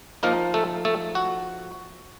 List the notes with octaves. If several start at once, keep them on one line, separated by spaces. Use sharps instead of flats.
F3 A#3 D#4 A#4
A3 A4
A3 A4
F#4